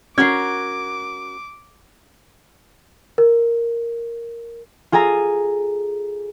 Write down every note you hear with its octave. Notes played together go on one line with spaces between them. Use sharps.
C#4 F#4 A#4 D6 G#6 C7
A#4
F4 G#4 A4 G#5 A#5